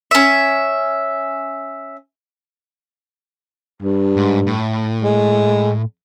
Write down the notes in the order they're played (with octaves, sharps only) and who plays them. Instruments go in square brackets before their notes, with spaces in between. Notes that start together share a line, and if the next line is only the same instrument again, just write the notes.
[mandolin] C#4 E5
[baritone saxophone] G2
[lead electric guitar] G#2
A2
[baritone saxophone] G#3